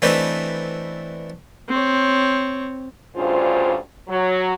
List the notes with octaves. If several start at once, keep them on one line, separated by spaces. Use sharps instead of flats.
E3 A3 C4 D4 D#4 B4
C4 C#5
D2 G2 C#3 F4 C5
F#3